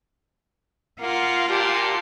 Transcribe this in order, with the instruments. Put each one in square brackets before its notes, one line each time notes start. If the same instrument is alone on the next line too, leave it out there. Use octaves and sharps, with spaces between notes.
[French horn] A#3 [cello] F4 [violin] F#5 C6
[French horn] A#2 [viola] G4 [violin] A5 C6